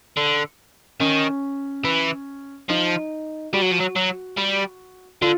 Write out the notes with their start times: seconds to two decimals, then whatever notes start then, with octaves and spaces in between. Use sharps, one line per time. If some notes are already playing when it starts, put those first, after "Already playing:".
0.17 D3
1.00 D#3 C#4
1.85 E3
2.69 F3 D#4
3.53 G3 F#4
3.62 F#3
3.71 F3
3.80 F#3
3.96 F#3
4.38 G3
5.22 D3 F4